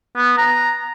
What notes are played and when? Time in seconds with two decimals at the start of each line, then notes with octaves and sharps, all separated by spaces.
0.17 B3
0.38 A#5